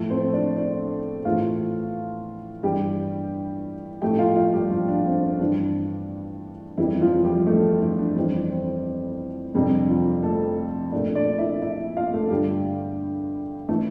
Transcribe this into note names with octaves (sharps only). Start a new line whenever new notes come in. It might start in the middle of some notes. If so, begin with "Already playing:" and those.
Already playing: A2 F3 A3 A4
C4 C5
D4 D5
D4 D5
A2 E3 A3 F4 F5
G2 E3 G3 G4 G5
A2 F3 A3 G4 G5
F4 F5
F4 F5
G3 G4
F3 F4
D4
C4
C4
G2 E3 G3 D4
F2 E3 G3 E4
F3 F4
G3 G4
A3 A4
E3 E4
D4
F2 E3 G3 C4
C4
F2 C3 G3 D4
F3 F4
A3 A4
A#2 A3 D4 D5
D4 D5
E4 E5
E4 E5
F4 F5
A3 A4
G2 D3 G3 G4
E3 A3 A4